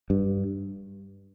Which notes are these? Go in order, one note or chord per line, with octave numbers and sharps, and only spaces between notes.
G2